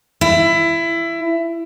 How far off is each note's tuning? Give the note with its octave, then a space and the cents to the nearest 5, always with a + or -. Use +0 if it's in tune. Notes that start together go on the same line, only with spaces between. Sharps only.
E4 +20